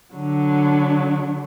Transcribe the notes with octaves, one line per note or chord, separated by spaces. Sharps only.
D3 F#3